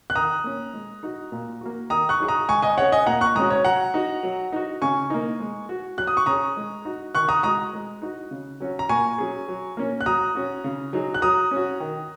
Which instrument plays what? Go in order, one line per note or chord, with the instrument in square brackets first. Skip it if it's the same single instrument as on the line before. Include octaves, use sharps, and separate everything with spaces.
[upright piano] F#6
[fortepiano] D#3 [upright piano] A#5 D#6
[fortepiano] A#3 C#4
G#3
D#4 F#4
A#2
A#3 F#4
[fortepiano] D#3 [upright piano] A#5 D#6
[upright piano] C#6 F#6
[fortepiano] F#3 D#4 G#4
[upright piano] A#5 D#6
[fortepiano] G#3 [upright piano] G#5 C#6
[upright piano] D#5 G#5
[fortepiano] C#4 G#4 [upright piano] C#5 F#5
[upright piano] D#5 G#5
[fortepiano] A#2 [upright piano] F#5 A#5
[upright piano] C#6 F#6
[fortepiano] G#3 C#4 F#4 [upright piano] A#5 D#6
[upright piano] C#5
[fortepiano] F#3 [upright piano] F#5 A#5
[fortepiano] D#4 F#4
F#3
D#4 F#4
[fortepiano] C#3 [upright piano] G#5 C#6
[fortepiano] A#3 D#4
G#3
F#4
[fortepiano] F#3 [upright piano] F#6
[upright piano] D#6
C#6
[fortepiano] C#4 G#4 [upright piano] A#5 D#6
[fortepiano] G#3
D#4 F#4
[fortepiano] D#3 [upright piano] C#6 F#6
[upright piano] A#5 D#6
[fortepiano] G#3 F#4 [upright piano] A#5 D#6
[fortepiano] G#3
D#4 F#4
C#3
F#3 C#4 F#4
[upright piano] A#5
[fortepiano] A#2 [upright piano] G#5 C#6
[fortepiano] F#3 C#4 G#4
F#3
A#3 C#4
[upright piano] F#6
[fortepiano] F#3 [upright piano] A#5 D#6
[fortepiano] C#4 F#4
C#3
F#3 D#4 G#4
[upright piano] F#6
[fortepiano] F#3 [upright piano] A#5 D#6
[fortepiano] C#4 F#4
D#3